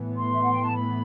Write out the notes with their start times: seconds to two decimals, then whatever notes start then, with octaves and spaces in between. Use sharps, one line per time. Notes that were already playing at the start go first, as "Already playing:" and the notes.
Already playing: A2 E3 B3
0.18 C6
0.33 E5
0.42 F#5
0.53 G5
0.62 A5
0.72 B5